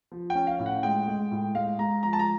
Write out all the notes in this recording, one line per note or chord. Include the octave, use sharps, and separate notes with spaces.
F3
C#4 G5
F5
A2
F#5
G#3 G5
G#3
A2
G#3 F5
G#3 A#5
F3 A#5
A5
A#5